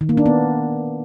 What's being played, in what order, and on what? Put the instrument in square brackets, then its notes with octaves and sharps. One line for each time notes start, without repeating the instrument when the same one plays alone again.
[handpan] D#3
A#3
D4
B3